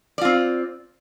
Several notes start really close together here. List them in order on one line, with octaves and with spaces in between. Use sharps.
D5 F4 C4